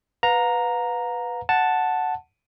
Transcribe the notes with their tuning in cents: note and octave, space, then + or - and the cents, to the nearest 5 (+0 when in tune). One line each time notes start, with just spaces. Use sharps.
B4 +0 F5 +40 A#5 +0
F#5 +0 A5 +0